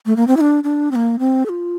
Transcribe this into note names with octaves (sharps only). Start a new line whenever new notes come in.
A3
A#3
C4
E4
D4
D4
C4
A#3
C4
A4
F4